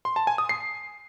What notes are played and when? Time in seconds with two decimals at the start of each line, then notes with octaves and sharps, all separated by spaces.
0.05 C6
0.16 A5
0.27 G#5
0.38 D#6
0.49 C7